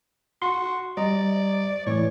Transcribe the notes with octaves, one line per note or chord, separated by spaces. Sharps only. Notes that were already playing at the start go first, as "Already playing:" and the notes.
F#4 C6
G3 D5 D#5 A#5
A2 E3 C#5